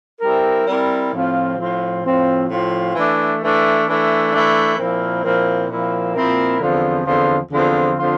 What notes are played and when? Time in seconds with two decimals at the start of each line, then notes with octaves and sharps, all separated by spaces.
0.21 G3 C4 E4 A#4
0.66 G3 C4 E4 A#4
1.12 A2 F3 C4 F4
1.57 A2 F3 C4 F4
2.03 A2 F3 C4 F4
2.50 A2 F3 C4 F4
2.95 E3 A3 D4
3.40 E3 A3 D4
3.85 E3 A3 D4
4.32 E3 A3 D4
4.77 A#2 F3 C4 E4 A#4
5.23 A#2 F3 C4 E4 A#4
5.69 A#2 F3 C4 E4 A#4
6.14 A#2 F3 C4 E4 A#4
6.60 E2 D3 F3 C4 F4
7.05 E2 D3 F3 C4 F4
7.51 E2 D3 F3 C4 F4
7.98 D3 F3 C4 F4